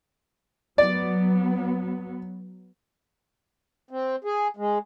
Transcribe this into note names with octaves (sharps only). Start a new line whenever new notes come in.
F#3 B3 D5
C4
G#4
G#3